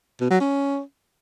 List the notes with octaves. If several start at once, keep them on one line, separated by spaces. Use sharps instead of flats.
B2
F#3
C#4